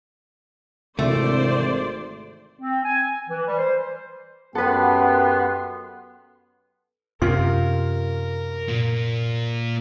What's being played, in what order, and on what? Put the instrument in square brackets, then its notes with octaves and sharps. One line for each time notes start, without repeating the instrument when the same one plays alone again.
[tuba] G#1 [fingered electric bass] C3 E3 [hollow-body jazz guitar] A3 [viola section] C5 D5
[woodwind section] C4
G#5
E3
G3
C5
[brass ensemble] F#2 G4 G5 [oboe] B3 [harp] A4 B4 [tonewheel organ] F#5 C6
[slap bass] F#2 C3 [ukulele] F4 [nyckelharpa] A#4
[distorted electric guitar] A#2